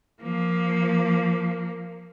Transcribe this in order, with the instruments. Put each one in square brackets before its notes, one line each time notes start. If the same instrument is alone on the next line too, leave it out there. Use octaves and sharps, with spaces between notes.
[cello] F3 A#3